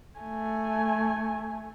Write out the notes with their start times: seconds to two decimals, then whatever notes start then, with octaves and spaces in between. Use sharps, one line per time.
0.19 A3 G#5